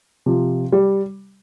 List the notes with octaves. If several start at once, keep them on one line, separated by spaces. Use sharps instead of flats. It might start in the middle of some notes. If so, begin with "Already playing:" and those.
C3 F3
G3